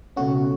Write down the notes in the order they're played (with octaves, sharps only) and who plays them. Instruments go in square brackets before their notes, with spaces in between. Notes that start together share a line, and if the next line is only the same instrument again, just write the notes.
[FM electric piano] C#2 B2 A3 C#4 F#4